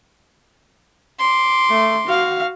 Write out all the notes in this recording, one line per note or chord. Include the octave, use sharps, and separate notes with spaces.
C6 D6
A3
F#4 F5